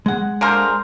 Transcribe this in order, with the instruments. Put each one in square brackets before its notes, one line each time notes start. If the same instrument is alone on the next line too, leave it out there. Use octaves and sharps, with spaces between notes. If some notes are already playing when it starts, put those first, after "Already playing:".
[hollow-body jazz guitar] G#3 F#5
[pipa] D3 A#3 A#4 [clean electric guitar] G#4 C5